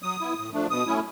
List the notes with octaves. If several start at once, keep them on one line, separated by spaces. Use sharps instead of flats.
F#3 D#6
B3 E4
A2
F3 A3 D4
B2 D#6
F#3 A3 C#4 E4